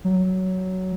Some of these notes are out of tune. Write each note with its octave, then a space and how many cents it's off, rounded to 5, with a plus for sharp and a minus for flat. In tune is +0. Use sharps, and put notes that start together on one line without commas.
F#3 +10